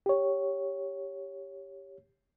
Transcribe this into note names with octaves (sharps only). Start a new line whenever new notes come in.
G4 C#5